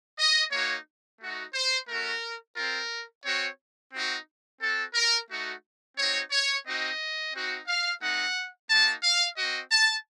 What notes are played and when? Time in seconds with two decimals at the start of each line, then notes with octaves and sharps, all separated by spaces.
0.18 D#5
0.52 A#3 D#4 F#4 C#5
1.20 A3 D#4 F#4
1.54 C5
1.88 A3 C#4 F#4 A#4
2.56 C4 F4 A#4
3.25 C4 F#4 C#5
3.93 C4 D#4 F#4
4.61 C4 F#4 A4
4.94 A#4
5.30 A3 D#4 F#4
5.97 C4 D#4 F#4 C#5
6.31 C#5
6.65 C4 D#4 F#4 D#5
7.34 C4 D#4 F#4
7.67 F5
8.01 A3 C4 D#4 F#5
8.69 A#3 D#4 F#4 A5
9.03 F5
9.37 C4 F#4 D#5
9.71 A5